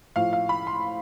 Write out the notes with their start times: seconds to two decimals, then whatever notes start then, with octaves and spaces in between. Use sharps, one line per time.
0.16 A2 F3 F5
0.33 F5
0.49 B5
0.67 C6